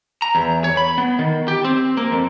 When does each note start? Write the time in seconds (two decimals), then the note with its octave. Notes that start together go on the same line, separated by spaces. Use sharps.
0.22 A#5
0.35 E2
0.64 C#5
0.77 B5
0.98 B3
1.19 D#3
1.48 G4
1.64 C4
1.97 A#3
2.12 F2